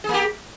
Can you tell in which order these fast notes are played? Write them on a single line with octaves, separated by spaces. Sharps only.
G#4 A#3 G4